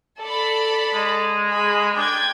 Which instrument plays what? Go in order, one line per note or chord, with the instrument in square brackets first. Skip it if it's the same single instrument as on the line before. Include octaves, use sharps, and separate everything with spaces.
[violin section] A4 D5 B5
[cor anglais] G#3
[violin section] G#4 B5
[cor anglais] D4 [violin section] G5 G#6